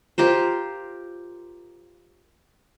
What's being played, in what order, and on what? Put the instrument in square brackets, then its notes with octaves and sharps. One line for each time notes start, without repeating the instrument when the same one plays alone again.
[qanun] F4 G4 A#4 C5